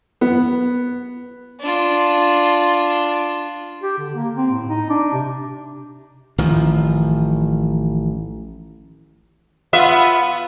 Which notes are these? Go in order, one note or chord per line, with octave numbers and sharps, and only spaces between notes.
B3
D4 F4
G4
D3
A#3
C4
A2
D#4
D4
C3
A1 D#3 F3
B3 F4 E5